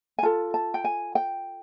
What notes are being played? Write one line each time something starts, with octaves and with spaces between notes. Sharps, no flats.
G#5
F4 A4 A5
A5
G5
G#5
G5